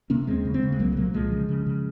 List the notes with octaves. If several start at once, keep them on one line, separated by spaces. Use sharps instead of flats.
C3 A#3 C#4
D#2 G#3 C4
C#3
G#3 C4
C#3
G#3
C2 F#3 A#3
G#3
A#2 F#3 A#3
C2 F3 G#3
C#3
C#3
C#3